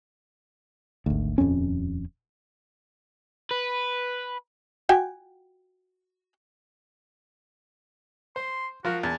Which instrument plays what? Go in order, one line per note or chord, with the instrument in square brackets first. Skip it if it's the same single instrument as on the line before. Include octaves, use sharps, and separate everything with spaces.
[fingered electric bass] G#1 D2
D#1 F2 C4 C#4
[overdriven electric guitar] B4
[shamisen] F#4 G5 G#5
[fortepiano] C5 [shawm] C6
[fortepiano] F3 F4 A#4 [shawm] F#4
[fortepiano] E2 [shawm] A5